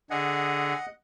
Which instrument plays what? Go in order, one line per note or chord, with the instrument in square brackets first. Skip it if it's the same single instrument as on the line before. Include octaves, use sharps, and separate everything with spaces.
[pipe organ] D3 G#4 [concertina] D#5 F#5